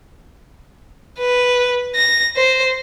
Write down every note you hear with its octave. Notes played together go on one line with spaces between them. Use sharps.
B4
A#6
C5